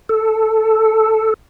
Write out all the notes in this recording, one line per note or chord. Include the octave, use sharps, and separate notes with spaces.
A4